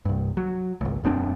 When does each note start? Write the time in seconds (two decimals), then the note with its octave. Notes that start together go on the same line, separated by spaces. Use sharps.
0.05 C2 G2
0.37 F#3
0.81 G#1 C#2
1.04 E1 F#2 C4 D4